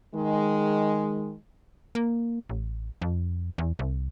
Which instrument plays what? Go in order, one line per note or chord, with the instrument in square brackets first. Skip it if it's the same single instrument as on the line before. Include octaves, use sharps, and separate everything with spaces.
[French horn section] D#3 G#3
[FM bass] A#3
A1
F2
E2
C2